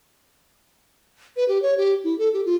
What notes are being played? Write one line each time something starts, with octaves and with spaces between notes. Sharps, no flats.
B4
G4
C#5
G4
E4
A4
G4
F4